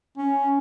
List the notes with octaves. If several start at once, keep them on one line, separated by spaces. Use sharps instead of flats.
C#4